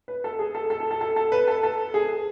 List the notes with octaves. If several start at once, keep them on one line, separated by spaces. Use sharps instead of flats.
B4
A4
G#4
A4
A4
A4
A4
A4
A4
B4
A4
A4
G#4